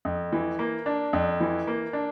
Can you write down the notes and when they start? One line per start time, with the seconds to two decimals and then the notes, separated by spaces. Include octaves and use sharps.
0.05 F2
0.32 E3
0.59 A#3
0.86 D4
1.13 F2
1.40 E3
1.67 A#3
1.93 D4